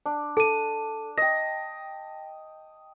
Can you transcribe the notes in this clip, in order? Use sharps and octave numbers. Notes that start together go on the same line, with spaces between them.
D4
A4 A5 D#7
D#5 G5 A#6